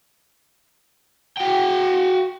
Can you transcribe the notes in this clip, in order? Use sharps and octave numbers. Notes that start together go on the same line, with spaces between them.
F#4 G5